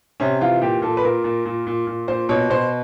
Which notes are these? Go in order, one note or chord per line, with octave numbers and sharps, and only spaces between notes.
C3 C#4
E3 F4
A#2 G4
A#2 A4
B4
A#2 A#4
A#2
A#2
A#2
A#2
A#2 C5
B2 C#5
B2 C5